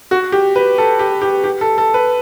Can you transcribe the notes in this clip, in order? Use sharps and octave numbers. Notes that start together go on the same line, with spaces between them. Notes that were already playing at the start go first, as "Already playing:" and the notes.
F#4
G4
B4
A4
G4
G4
G4
A4
A4
B4